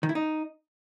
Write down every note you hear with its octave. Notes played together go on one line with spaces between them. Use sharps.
D#3
E4
D#4